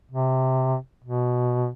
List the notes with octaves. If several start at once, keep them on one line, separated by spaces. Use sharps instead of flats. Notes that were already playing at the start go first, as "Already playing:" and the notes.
C3
B2